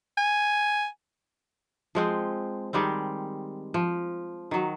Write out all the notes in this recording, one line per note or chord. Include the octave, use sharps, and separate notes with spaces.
G#5
F3 G#3 C4
D#3 G3 G#3 C4
F3
D#3 F#3